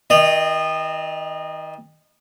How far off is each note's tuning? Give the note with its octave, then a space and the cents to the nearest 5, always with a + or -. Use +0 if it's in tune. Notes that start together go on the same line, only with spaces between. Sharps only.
D#3 +35 D#5 -25